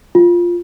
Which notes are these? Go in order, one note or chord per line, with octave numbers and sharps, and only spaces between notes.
F4